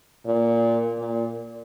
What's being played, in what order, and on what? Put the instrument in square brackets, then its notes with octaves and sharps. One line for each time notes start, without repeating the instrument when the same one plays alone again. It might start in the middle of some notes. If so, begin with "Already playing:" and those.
[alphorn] A#2
A#2